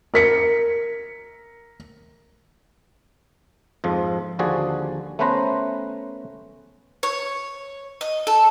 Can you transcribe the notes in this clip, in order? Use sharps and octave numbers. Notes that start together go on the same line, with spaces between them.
A#4 B6 C#7
F2 G#2 F3
D#2 D3 F3 F#4 G#4 D5
A3 B3 C#4 B4 C5 A#5
C#5
D#5
A4